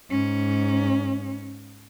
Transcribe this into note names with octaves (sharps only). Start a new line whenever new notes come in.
G#2 C#4